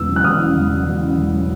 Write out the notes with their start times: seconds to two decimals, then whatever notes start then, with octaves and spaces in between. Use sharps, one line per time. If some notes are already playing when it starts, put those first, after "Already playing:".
Already playing: E1 E2 C#3 E6
0.09 F#3
0.16 F#6
0.24 E2 D#6 F6
0.40 C#3
0.56 E1
0.71 F#3
0.87 E2
1.02 C#3
1.17 E1
1.33 F#3